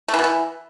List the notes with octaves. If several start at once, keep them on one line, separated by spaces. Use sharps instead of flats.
A3
E3
B2
E3